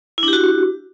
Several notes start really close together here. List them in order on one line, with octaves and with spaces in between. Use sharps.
E4 D4 G4 F#4